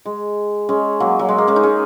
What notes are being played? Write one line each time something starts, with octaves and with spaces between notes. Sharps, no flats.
G#3
G#3 C#4
F#3 A#3
F#3
G#3
A#3
G#3 C#4
D#4
G#3 C#4